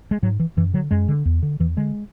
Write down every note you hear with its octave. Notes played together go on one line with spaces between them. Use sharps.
G#3
G#2 F#3
E3
F#2 E3
D3 F#3
F#2 G#3
D3
E2
D3
E2 E3
D3 G#3